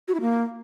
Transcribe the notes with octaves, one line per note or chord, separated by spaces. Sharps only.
F#4
E4
A#3